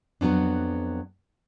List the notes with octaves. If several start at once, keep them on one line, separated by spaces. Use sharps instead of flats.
F2 F#3 B3 C#4 D4